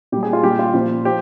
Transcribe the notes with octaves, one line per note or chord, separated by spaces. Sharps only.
A#2 G3 G4
G#4
F4
A#2 G3 G4
F4
A#2 F3
F3 G4